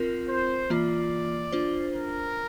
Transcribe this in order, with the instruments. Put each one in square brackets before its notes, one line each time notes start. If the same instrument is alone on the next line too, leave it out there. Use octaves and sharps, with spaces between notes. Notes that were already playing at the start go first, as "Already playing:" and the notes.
Already playing: [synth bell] C4 F4 A#4
[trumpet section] C5
[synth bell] E3 A#3 F4 [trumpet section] D5
[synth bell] D4 F4 C5
[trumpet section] A#4